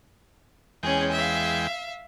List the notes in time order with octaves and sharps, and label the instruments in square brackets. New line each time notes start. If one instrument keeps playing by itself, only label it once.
[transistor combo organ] E2 G#3 G5 [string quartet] C#4 G#4
[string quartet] E5 F5